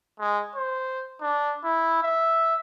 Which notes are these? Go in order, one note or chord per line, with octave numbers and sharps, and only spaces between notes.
G#3
C5
D4
E4
E5